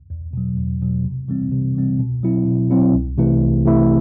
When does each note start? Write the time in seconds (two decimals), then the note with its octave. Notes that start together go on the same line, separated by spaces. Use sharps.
0.10 E2
0.33 B2 F#3
0.57 E2
0.82 B2 F#3
1.05 C3
1.28 E3 G3 C4
1.52 C3
1.75 E3 G3 C4
2.00 B2
2.23 F#3 C4 E4
2.47 B2
2.71 F#3 C4 E4
2.94 C2
3.18 C3 E3 A3 E4
3.42 C2
3.65 C3 E3 A3 E4